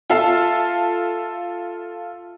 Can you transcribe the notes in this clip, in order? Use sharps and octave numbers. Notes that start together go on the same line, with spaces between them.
F4 A4 E5 F5 A5